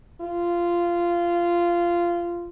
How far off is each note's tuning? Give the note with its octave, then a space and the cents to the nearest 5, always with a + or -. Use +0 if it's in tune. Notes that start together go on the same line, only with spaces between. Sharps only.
F4 -15